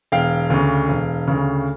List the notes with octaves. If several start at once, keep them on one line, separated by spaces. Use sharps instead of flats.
E1 F5 G5
D2 C#3
E1
D2 C#3